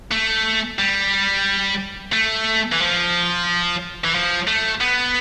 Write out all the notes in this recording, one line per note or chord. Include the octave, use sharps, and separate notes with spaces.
A3
G3
A3
E3
F3
E3
F3
A3
B3